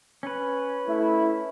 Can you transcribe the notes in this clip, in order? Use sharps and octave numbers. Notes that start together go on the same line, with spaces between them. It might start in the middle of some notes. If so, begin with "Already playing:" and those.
C#4 B4
A3 E4